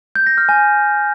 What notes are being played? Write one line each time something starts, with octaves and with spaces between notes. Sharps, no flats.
G6
A#6
F6
G#5